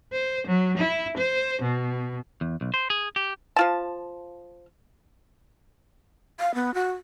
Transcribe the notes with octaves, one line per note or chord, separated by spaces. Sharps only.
C5
F#3
E4
C5
B2
E2
B1
C5
G#4
G4
F3 F4 A5
F5
B3
F#4